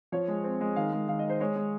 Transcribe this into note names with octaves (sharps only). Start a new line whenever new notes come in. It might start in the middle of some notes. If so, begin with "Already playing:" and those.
F3 C#5
G#3
C4
G#3
D#3 F5
G#3
D#3 F5
D#5
D#3
C5
G#3 C#5
G#3